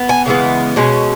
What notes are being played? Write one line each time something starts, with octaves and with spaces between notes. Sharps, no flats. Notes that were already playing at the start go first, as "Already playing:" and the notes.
Already playing: B3
G#5
C#3 E3 G#3 B3
B2 G#3 C#4